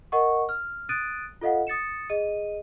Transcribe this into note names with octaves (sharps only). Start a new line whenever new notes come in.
A#4 D#5 F#5 C#6
F6
D#6 F#6 A6 D7 D#7
F4 A4 D#5 F5 F#5
D#6 A6 C#7 E7
G#4 D#5 D#7